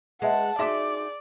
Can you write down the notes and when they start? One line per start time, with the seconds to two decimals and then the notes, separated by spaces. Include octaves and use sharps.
0.22 G#3 B4 D#5 E5 F#5 A5
0.59 D#4 F#4 G#4 D5 E5 C6 D6